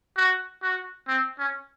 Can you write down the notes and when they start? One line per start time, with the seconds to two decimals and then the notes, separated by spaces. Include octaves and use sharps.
0.17 F#4
0.63 F#4
1.08 C4
1.39 C#4